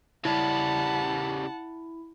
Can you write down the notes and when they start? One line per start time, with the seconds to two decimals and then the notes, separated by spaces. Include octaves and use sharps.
0.25 C#3 G3 E4 F#5 A5